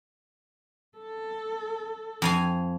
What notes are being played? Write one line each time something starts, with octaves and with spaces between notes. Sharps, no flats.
A4
F2 F5 G#5